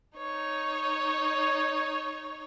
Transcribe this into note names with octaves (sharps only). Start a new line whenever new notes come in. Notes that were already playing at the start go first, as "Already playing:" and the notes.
D#4 C#5